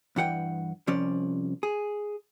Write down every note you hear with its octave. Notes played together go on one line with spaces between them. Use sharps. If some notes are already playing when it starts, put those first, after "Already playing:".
G2 E3 F#5 G5
C2 F3 C#4 D5
G#4